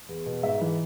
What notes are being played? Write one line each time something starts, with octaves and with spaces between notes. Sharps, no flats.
E2
B2
G#2 E5
E3